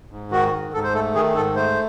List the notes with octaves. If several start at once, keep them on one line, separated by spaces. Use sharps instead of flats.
G#2
D#3 F#4
G#2
G#2 A4
C5
A3 A4
D#3 G#4
G#2 A4
A3 C5